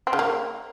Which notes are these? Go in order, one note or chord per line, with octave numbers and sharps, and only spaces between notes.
C4
C#3
A#3